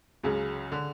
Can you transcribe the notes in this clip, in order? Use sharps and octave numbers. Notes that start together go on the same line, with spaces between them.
C#2 C#3 F#3
D3